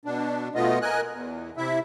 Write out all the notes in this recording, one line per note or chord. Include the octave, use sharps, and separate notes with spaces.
B2 D4
B2 A3 B3 F4 D#5
A#4 D#5 G#5 F#6
E2
C3 E4 E5